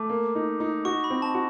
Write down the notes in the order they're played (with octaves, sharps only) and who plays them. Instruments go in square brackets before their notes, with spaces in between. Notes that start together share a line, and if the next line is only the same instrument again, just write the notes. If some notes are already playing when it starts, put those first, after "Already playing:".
Already playing: [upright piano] A3 [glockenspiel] D6
[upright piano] A#3
D#4
D#4
[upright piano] F#4 [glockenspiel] C#6
[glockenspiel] B5
[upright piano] C4
[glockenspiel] A5
[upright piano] F#4